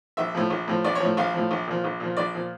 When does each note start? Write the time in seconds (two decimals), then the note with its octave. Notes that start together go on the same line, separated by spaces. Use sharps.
0.17 A#1 E5
0.35 A2 F3
0.50 A#1
0.68 A2 F3
0.84 A#1 D5
0.95 C#5
1.00 A2 F3
1.17 A#1 F5
1.34 A2 F3
1.51 A#1
1.67 A#2 F3
1.84 A#1
2.00 A#2 F3
2.17 A#1 D5
2.34 A#2 F3